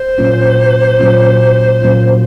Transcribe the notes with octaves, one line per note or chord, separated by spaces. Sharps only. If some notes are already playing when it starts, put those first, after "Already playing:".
Already playing: C5
A#2 F#3 A#3 C#4 F4
A#2 F#3 A#3 C#4 F4
A#2 F#3 A#3 C#4 F4